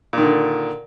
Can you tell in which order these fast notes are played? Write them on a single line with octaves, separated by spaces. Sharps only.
A#2 D#3 D3